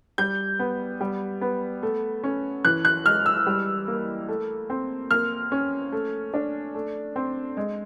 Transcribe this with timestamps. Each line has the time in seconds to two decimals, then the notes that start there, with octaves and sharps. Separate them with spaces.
0.18 G3 G6
0.59 B3
1.01 G3
1.41 B3
1.83 A3
2.24 C#4
2.65 E3 F#6
2.85 F#6
3.06 G#3 F6
3.26 E6
3.47 G3
3.88 A#3
4.29 A3
4.70 C4
5.10 A#3 F6
5.52 C#4
5.92 A3
6.34 D4
6.75 A3
7.16 C4
7.57 G#3